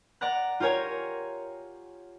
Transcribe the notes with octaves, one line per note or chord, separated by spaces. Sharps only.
D5 F#5 A#5 F#6
F4 G4 A#4 C#5 G#5